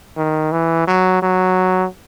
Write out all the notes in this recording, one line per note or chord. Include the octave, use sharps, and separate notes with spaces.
D#3
E3
F#3
F#3